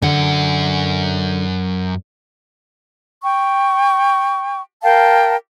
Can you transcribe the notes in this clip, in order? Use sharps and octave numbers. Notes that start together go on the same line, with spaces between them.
F#2 D3 F#5
G5 C#6
A#4 F5 G5 A5